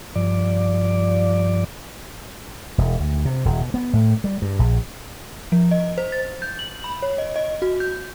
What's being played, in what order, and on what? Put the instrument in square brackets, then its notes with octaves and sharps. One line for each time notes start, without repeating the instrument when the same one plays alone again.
[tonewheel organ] G2 F3 D5
[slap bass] E1
D2
C3
D#1
B2
B3
A2
G3
G2
A#1
[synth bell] F3
D#5
C5
A6
G6
F#7
B5
C#5
D#5
D#5
F#4
G6